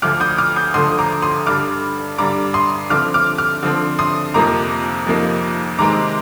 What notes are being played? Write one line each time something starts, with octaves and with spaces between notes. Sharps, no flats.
D2 D3 F3 D6 F6
D#6 G6
D6 F6
D#6 G6
D2 D3 F3 C6 D#6
A#5 D6
C6 D#6
G2 D3 G3 D6 F6
G2 D3 G3 A#5 D6
C6 D#6
D3 F3 C4 D6 F6
D6 F6
D6 F6
D3 F3 C4
C6 D#6
F2 C3 F3 A#3 D#4 A#5 D6
F2 C3 F3 A#3 D#4
C3 D#3 G#3 C4 D#4 A#5 D6